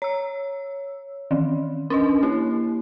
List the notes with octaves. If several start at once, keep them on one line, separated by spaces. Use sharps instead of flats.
C#5 E6
D#3 E3
C#4 D4 D#5
A#3 E4